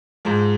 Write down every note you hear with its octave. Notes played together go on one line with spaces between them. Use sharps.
G#2 F3 G#3